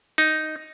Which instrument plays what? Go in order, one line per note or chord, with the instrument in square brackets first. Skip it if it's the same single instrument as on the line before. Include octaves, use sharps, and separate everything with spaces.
[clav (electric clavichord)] D#4